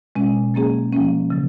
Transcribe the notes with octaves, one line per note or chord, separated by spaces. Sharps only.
B2 G#3 C#4
F#3 A#3 C#4 G#4
F3 A#3 C#4
C#3 F#3